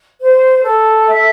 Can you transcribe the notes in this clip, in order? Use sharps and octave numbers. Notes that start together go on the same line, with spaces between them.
C5
A4
E5